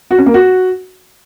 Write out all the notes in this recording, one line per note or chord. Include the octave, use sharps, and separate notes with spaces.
F#4
C#4
A#3
F#4